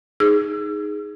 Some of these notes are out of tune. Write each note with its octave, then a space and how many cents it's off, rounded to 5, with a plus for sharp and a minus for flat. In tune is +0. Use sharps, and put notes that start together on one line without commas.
D#4 +0 G#4 +0 E6 +35